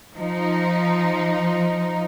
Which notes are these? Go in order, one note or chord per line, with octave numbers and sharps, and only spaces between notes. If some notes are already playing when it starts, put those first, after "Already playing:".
F3 D#4